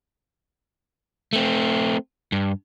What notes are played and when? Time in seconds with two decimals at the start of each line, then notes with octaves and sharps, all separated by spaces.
1.33 A3 C4
2.32 G2